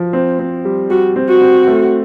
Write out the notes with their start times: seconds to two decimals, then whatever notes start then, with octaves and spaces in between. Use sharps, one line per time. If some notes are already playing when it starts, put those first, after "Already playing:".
Already playing: F3
0.13 C4
0.39 C4
0.65 G3
0.90 G3 F#4
1.16 C4
1.29 F#4
1.41 C4
1.67 A3